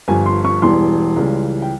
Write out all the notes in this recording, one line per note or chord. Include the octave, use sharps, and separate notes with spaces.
G1 G2 F3 G#5
C6
C#6
E1 E2 E3 G3 C6
C#2 C#3 E3 G3
G5